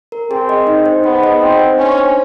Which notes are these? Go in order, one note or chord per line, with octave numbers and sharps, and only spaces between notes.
A#4
C4 G#4
D#5
D#4
C5
B3 G#4
D#5
C4 D#4
C5
C#4 D4
C5